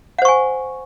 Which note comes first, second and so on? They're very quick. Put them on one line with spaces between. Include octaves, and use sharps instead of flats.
F#5 C5 C#6 G#5